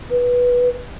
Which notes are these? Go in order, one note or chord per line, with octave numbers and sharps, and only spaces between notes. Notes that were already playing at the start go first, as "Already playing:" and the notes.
B4